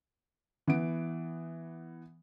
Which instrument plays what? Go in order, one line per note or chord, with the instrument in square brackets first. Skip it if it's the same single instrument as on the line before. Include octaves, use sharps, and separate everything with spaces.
[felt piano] E3 B3 D7